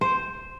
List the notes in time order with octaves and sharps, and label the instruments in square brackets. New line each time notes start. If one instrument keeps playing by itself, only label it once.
[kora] C5